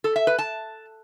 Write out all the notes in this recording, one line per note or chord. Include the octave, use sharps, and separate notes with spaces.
A4
E5
B4
A5